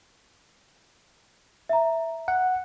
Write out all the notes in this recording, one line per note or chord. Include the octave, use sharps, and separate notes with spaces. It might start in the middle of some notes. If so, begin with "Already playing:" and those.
E5 A#5
F#5